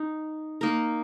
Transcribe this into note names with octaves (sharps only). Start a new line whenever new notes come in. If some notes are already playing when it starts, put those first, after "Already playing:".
Already playing: D#4
A#3 D#4 A#4